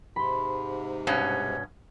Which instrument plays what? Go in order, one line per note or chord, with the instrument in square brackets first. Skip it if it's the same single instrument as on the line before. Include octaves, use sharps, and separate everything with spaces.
[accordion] G#2 C3 [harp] B5 C6
[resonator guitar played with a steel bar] G2 B2 C#4